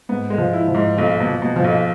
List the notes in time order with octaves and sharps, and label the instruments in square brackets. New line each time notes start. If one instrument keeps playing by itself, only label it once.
[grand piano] G#2 [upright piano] B3
[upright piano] G#3
[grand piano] F3
[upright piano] E4
[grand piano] F3
[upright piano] G#2
[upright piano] B1 [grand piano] F3
[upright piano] B2
[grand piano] F3
[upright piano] B2
[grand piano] F3
[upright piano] B1